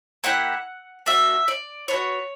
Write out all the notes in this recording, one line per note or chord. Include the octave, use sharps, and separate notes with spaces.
A#3 E4 G4 F#5
A#3 D4 F#4 E5
D5
B3 D4 C#5
F#4